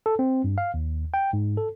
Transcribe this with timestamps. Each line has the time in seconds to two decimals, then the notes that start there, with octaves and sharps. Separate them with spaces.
0.06 A4
0.19 C4
0.44 G2
0.58 F5
0.74 D#2
1.14 G5
1.33 G#2
1.57 A4